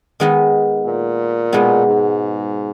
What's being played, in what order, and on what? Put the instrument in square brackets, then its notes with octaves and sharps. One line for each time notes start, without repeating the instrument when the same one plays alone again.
[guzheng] D#3 G#3 B3 D#4
[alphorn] A#2
[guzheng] B2 G#3 B3 D#4
[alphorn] G#2